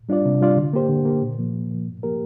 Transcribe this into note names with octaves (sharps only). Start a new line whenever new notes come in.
G3 D4 F4 D5
C3
G3 D4 F4 D5
D3
A#3 G4 C5
D3
A#3 G4 C5
A#2
F3 A#3
A#2
F3 A#3
G2
F3 A#3 G4 A#4